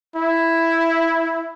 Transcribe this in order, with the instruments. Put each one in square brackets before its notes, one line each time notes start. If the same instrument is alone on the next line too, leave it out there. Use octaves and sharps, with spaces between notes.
[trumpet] E4